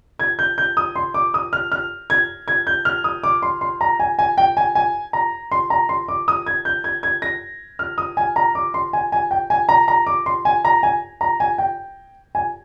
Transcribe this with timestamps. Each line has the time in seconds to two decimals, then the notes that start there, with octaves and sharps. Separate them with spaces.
0.19 G#6
0.39 G6
0.58 G6
0.77 D#6
0.96 C6
1.14 D6
1.34 D#6
1.53 F6
1.72 F6
2.10 G#6
2.48 G#6
2.67 G6
2.85 F6
3.04 D#6
3.24 D6
3.42 C6
3.61 C6
3.81 A#5
4.00 G#5
4.19 G#5
4.38 G5
4.57 G#5
4.75 G#5
5.13 A#5
5.51 C6
5.70 A#5
5.89 C6
6.08 D6
6.28 D#6
6.46 G#6
6.65 G6
6.84 G#6
7.03 G#6
7.22 A#6
7.79 F6
7.98 D#6
8.17 G#5
8.36 A#5
8.55 D6
8.74 C6
8.93 G#5
9.12 G#5
9.31 G5
9.50 G#5
9.69 A#5
9.88 A#5
10.07 D6
10.26 C6
10.45 G#5
10.65 A#5
10.83 G#5
11.21 A#5
11.40 G#5
11.58 G5
12.35 G#5